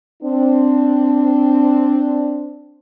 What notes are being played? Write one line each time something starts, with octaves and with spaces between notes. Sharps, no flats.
C4 D4